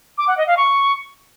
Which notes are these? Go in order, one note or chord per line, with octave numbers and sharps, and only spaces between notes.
D6
F#5
D#5
F5
C#6